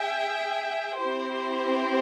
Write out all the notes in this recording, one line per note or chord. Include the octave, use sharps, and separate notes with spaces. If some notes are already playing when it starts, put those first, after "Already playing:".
Already playing: G#4 E5 G5
C4 E4 G4 C5